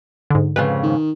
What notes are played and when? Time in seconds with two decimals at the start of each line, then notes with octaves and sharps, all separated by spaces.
0.30 G#2 D3
0.56 F2 G#2 C#3 B4
0.83 D#3